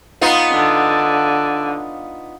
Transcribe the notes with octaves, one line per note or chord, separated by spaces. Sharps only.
B3 D#4 F4
D3